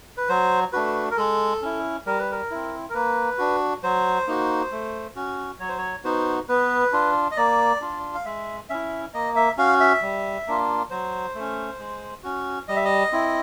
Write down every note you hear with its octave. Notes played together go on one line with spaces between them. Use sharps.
B4
F#3 C5
A3 D4 F#4 B4
A#4
G#3 A4
C#4 E4
G3 A#4
B4
A#4
C4 E4
A#4
A#3 B4
D4 F#4
F#3 C5
A#3 D#4 F#4
A3
C#4 F#4
F#3 C#5
C5
C#5
B3 D#4 F#4 C5
B3 B4
D4 F4
D#5
A#3 D5
D4 F4
F5
G#3 E5
C#4 E4 E5
A#3 D#5
E5
C#4 F#4 F5
E5
G3
A#3 D4 F4
F#3 C5
A3 C#4
G#3
C#4 F#4
G3 D#5
E5
D#5
C4 E4